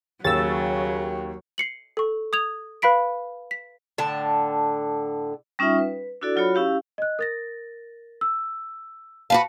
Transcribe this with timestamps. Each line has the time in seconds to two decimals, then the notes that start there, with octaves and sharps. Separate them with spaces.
0.24 D#2 C#3 F#3 E6 A6
1.58 C7 C#7 F#7
1.97 A4 C#6
2.33 D#6 G#6 F7
2.82 B4 F5 B5 B6 D7
3.51 B6
3.98 A2 D3 A5
5.59 G3 C#4 D#4 F4 E5 G5
5.78 B4
6.22 D4 E4 F#4 A4 D5
6.36 F#3 F4 F#4 C#5 B5
6.55 C#4 E4 G4 F5
6.98 D#5 F#6
7.19 A#4 A6 A#6
8.21 E6
9.30 F#4 B4 F5 A5